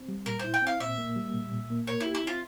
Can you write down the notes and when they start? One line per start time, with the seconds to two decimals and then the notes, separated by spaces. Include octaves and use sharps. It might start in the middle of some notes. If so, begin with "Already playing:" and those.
Already playing: C4
0.08 G3
0.26 A#2 A#4
0.39 E4 C5
0.54 G5
0.62 C4 F5
0.80 A#2 E5
0.98 A#3
1.16 G3
1.34 A#2
1.52 A#2
1.70 A#3
1.87 A#4 C#5
2.00 E4 G4
2.15 E4
2.23 C4 F4